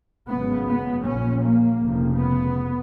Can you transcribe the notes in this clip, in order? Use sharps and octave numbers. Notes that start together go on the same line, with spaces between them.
G#1 F#2 C#3 B3
B3
A#1 A#2 C#4
A#3
F1 F2 C#3
B3